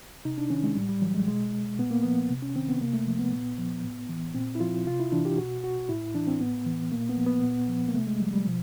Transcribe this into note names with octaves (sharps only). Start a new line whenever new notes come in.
C3 D#4
D4
D#3 C#4
G#3
A2 G3
G3
E3 F#3
G#3
B2 G#3
A#2 B3
A#3
F3 B3
C3
C#4
D#3 C4
B3
C3 A#3
A3
F3
B3
A#2
F3
A2
E3
A#2 C4
E4
F3 F4
C3 F4
E4
E3 D4
G4
B2 F#4
F#4
A2 E4
E3 D4
C4
A2 B3
E3
A#2 A#3
B3
F3
B3
A#2
F3
A#3
C3 A3
G#3
F3 G3
G3
B2 F3